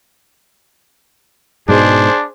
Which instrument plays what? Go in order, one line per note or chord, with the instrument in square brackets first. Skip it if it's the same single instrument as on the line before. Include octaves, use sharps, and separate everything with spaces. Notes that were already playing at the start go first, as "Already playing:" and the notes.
[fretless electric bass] G#2 B2 G#3 [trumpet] D4 [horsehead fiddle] G#4 C5